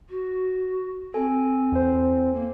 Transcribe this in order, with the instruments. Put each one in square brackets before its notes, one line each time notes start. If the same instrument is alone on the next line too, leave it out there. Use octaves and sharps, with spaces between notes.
[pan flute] F#4
[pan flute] C4 [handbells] A4 G#5
[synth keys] E2 C5
[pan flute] A#3